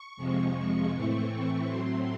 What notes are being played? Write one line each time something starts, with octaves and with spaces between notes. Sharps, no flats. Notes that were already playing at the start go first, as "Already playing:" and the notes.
Already playing: C#6
F2 C3 F3 G#3
A2 E3 A3 C4
A2 F#3 A3 C4 C6